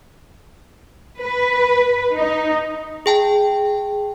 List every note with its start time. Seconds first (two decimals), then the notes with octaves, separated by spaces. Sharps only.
1.21 B4
2.16 D#4
3.06 G#4 G5 A5